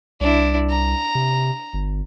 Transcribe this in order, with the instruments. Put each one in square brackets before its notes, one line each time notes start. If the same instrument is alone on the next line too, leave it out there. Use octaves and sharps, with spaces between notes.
[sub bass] C2 [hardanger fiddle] D4 E4
[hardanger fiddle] A#5
[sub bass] C3
G1